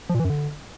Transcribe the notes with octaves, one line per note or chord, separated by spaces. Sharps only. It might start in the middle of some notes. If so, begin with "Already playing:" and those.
F3
A#2
E3
F#2
D3